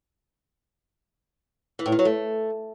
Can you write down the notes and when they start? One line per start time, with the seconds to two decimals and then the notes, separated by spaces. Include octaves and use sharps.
1.79 E3
1.86 A2
1.92 D#3
1.99 F#3
2.05 A3